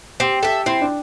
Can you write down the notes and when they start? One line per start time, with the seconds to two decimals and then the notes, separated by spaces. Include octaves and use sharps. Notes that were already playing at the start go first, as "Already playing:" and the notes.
0.20 C4 G4
0.43 G4 A4 E5
0.66 C4 E4
0.81 D4